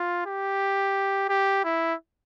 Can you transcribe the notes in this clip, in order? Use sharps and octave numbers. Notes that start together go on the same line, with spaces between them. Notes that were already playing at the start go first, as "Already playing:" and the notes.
Already playing: F4
G4
G4
E4